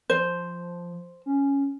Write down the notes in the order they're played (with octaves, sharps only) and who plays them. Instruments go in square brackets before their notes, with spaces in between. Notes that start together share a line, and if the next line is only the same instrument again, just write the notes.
[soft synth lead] F3 [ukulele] C5
[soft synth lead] C#4